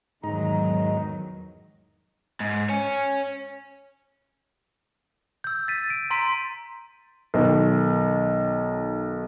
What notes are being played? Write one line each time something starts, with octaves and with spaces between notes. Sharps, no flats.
E2 G#2 D#3 F#3 D#4 A#5
G#2
C#5 G#5
E6 G6
A6 B6 D#7
D7
A#5 C6 B6 D7 D#7
B1 D#3